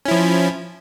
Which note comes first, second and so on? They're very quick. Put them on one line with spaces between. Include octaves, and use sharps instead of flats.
C#4 E4 F3